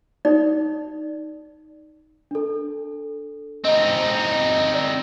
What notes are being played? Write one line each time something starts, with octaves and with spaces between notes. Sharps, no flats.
D#4 D5
D4 A4
C4 D#4 D#5
D5